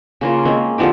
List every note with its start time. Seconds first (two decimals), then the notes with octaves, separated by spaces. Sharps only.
0.21 C#3 A#3 F4
0.45 G#3 A#3 C4 C#4
0.78 D3 F3 C4 G4